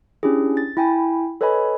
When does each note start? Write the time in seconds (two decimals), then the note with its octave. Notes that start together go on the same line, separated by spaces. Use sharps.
0.23 C#4 D4 E4 G4 G#4
0.57 A6
0.77 E4 G5 G#5 B5
1.41 A4 B4 C#5 D#5 G#5 B5